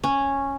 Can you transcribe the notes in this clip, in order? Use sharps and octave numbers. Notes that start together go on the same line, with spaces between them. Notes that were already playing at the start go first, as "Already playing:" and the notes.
C#4